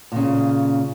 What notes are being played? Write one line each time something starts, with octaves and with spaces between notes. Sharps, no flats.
A#2 C#3